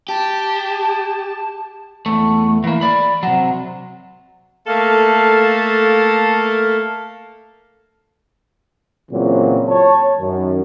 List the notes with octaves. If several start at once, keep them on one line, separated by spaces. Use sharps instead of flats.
G4 A5
E2 A3
E3 A#3
D5 B5
C3 F#3
A3 A#3 A4 F5
A#2 C#3 E3 F#3 C4
C#5 A5
F#2 D#3